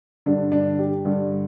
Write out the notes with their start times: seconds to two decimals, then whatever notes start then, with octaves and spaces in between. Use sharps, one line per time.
0.26 G2 D3 D4
0.52 D4
0.79 G4
1.05 G2 D3